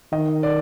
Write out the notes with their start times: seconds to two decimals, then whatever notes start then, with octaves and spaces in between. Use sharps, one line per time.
0.12 D#3 D#5
0.43 D5